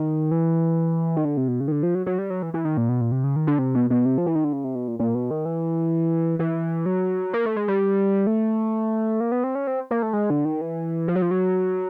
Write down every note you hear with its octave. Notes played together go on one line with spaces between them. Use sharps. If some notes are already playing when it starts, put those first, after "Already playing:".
Already playing: D#3
E3
D#3
D3
C3
B2
C#3
D#3
D3
F3
F#3
F#3
G3
F#3
E3
E3
D#3
A#2
B2
A#2
C3
C#3
D#3
D3
C3
B2
B2
C3
F3
E3
D#3
D3
C#3
C3
B2
A#2
A#2
B2
D#3
E3
E3
F#3
A#3
A3
G#3
G3
A3
A#3
B3
C4
C#4
C4
A#3
A3
G#3
D3
D#3
E3
F3
F#3
F3
F#3